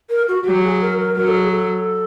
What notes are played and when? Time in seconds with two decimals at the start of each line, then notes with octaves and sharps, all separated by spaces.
0.09 A#4
0.28 F#4
0.46 F#3 G4
0.64 G#4
0.81 A#4
0.99 A#4
1.17 F#3 A#4
1.27 A4
1.38 G#4
1.48 A4